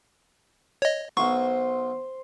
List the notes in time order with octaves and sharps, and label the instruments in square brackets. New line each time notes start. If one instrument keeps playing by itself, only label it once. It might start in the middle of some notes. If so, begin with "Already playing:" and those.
[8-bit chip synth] C#5 D#5
[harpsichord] B1 F#3 [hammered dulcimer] C5 [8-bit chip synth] C#6